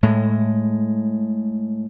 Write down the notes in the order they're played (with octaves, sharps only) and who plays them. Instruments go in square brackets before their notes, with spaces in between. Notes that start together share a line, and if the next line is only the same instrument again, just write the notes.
[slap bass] A2 G#3